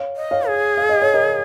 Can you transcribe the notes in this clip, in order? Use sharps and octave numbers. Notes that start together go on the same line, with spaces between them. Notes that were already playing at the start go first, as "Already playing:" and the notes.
Already playing: C#5 F5
D#5
C#5 F5
G#4
F5
D#5
C#5
A#4 D#5